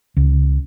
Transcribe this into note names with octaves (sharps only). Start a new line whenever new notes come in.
C#2